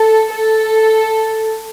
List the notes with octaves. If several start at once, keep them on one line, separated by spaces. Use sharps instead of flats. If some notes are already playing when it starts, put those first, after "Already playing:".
Already playing: A4
A4